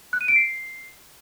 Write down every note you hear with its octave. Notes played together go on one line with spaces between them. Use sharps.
F#6
D#7
D7
C7